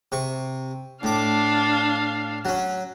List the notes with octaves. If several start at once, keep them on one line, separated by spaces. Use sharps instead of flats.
C3 C#6
A2 D4 F5 D6
F#3 C#4